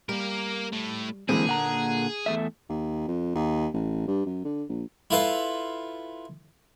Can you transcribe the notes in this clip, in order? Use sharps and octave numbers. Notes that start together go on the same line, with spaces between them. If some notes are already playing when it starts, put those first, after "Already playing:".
G3 A#3 A#4
A2 A3
D3 E3 G#3 A#3 C4 G#4
A#2 F#5 A#5
E2 A3 E5
D#2
F2
D#2
A1
G2
F#2
D3
A#1
E4 F4 A4 B4 F5